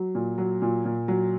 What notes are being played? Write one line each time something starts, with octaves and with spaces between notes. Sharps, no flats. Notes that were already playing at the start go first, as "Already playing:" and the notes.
Already playing: F#3
A#2
F#3
A#2
A#2
F#3